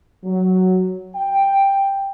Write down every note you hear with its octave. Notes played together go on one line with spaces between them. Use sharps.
F#3
G5